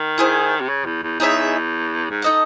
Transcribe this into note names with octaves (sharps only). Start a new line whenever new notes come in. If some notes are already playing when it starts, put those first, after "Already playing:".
Already playing: D#3
E4 G#4 C5
C3
C#3
E2
E2
E2 D#4 G#4 C#5 E5
G#2
D#4 A4 D#5 F#5